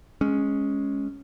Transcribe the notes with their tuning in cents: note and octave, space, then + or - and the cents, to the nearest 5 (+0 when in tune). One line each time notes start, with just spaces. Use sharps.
G#3 +0 C#4 +0